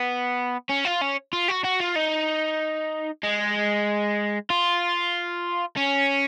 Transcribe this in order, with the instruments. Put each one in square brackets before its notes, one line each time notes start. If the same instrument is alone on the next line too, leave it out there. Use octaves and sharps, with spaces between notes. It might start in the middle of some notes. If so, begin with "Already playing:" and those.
Already playing: [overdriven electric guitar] B3
C#4
F4
C#4
F4
F#4
F#4
F4
D#4
G#3
F4
C#4